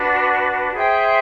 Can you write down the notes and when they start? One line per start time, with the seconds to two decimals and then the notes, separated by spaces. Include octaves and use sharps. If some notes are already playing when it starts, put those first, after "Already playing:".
Already playing: D4 F#4 B4
0.73 G#4 C5 E5 G5